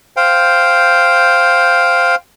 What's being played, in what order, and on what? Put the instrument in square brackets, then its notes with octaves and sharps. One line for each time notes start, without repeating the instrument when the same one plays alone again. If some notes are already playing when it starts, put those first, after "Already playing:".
[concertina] C5 F5 G5